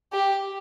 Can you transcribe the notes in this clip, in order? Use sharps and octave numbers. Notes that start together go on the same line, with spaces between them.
G4